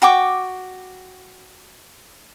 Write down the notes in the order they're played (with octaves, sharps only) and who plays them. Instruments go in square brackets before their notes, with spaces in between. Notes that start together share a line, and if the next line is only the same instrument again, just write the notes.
[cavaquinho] F#4 G5 C#6 D6